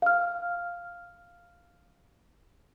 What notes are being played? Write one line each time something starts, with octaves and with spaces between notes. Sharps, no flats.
F5 F6